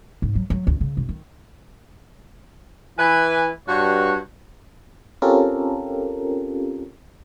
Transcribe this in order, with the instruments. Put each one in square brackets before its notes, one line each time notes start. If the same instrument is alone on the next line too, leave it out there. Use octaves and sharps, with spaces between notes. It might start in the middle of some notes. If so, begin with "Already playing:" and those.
[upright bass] G#2
F#3
F#3
D2
C#3
E1
D#3
[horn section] E3 B4 G#5
G2 F#4 C#5
[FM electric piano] C4 C#4 F4 G4 A4 A#4